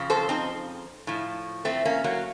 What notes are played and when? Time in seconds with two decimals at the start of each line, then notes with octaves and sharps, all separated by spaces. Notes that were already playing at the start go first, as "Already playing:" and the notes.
Already playing: F2 C#3 F3
0.10 A4 C5
0.29 C4 D#4
1.07 A2 F3
1.65 A3 C4
1.85 A#3 C#4
2.04 F#3 A#3